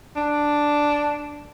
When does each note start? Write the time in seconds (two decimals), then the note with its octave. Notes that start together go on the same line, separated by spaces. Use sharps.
0.16 D4